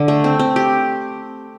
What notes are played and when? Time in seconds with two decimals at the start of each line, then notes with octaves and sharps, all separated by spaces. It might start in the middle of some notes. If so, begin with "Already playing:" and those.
Already playing: D3
0.08 A3
0.24 C4
0.39 C4
0.56 G4